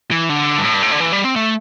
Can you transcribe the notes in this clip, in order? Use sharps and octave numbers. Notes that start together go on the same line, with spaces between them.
E3
D3
G2
A2
G2
A2
D3
E3
G3
C4
A3